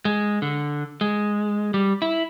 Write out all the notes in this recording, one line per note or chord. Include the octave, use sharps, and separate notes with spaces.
G#3
D3
G#3
G3
E4